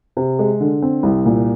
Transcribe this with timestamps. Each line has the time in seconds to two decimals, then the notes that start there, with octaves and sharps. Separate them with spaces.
0.17 C3
0.39 G#3
0.60 D3
0.82 C4
1.03 C2
1.26 A#2